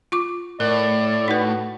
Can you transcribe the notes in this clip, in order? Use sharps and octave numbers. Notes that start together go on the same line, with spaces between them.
F4 C#6 D6
A2 A#4 D5
D#4 F#4 B4